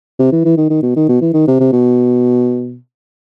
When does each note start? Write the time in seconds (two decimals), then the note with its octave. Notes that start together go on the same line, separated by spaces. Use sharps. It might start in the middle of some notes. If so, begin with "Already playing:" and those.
0.19 C3
0.32 E3
0.45 E3
0.57 D#3
0.70 D#3
0.82 B2
0.96 D#3
1.09 B2
1.21 E3
1.33 D#3
1.47 C3
1.60 C3
1.72 B2